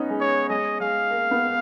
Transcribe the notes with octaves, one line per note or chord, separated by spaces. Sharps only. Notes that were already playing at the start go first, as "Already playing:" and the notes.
Already playing: B3 C#4 D#4
G#3
C#5
G#3 D#5
G#3 F5
A#3
B3